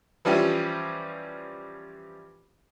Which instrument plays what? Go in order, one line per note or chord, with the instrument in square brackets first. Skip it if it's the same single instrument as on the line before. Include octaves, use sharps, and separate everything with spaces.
[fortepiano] E3 F3 G3 C#4 F4 G4